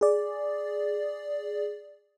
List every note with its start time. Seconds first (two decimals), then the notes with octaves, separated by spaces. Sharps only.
0.01 G#4 D5